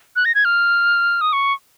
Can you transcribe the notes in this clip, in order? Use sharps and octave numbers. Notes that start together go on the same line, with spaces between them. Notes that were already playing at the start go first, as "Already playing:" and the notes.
F#6
A#6
G#6
F6
D#6
C#6